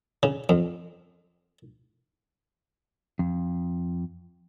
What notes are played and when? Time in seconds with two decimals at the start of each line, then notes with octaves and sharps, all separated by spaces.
0.23 C#3
0.49 F2
3.19 F2